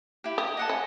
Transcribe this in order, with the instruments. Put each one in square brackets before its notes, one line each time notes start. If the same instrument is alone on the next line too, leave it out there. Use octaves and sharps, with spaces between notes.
[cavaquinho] E4 G4
[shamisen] G4 [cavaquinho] D#6
[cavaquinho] D#5 F#5 A5
[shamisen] C#4